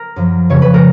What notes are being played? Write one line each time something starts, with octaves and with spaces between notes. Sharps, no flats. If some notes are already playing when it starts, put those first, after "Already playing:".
Already playing: A#4
F#2 F3
F2 C#3 F3 C#5
B4
A#4